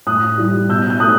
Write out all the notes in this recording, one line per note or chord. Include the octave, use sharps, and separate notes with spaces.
A2 D#6 F#6
E3 G3
B2 E6 G6
G6
A3 D#6 F#6